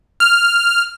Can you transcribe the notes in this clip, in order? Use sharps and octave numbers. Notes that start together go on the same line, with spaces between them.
F6